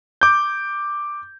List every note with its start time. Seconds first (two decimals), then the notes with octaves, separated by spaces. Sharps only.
0.21 D6 G6